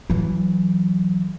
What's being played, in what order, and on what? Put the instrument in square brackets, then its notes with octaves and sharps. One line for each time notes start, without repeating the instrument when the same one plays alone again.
[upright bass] E3 F#3